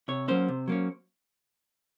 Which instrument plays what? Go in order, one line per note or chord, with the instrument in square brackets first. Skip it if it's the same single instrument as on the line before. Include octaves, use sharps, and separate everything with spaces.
[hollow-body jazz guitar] C3 C#5
F#3 A#3 C#4 C5
C3
F#3 A#3 C#4